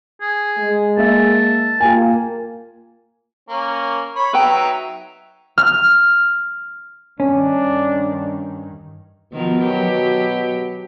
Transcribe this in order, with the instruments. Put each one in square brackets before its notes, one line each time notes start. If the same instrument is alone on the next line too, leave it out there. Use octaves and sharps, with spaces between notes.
[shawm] G#4
[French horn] G#3
[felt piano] A#3 E5 [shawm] A5
[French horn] A#3 [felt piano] F4 G5 G#5
[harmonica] A#3 C#4
C#5 B5
[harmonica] F#3 D#4 E5 [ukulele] B4 G5
[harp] F6
[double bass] G2 D#3 [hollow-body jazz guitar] C#4 [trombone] D4
[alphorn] B2 [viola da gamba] D#3 F3 B3
[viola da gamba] F#3 G4